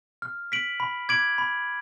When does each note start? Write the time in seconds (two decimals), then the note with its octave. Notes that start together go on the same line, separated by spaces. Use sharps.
0.22 F6
0.52 B6 D7 F#7
0.80 B5
1.09 D6 G#6 D7 F#7
1.38 B5